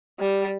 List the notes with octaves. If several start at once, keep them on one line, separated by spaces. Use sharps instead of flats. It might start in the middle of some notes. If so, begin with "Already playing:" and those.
G3